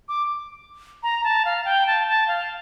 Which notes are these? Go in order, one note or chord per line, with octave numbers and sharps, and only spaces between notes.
D6
A#5
A5
F5
G5
A5
A5
F5